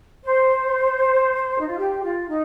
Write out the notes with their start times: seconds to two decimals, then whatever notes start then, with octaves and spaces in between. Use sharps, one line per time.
0.23 C5
1.59 D#4
1.67 F4
1.77 G4
2.02 F4
2.27 D#4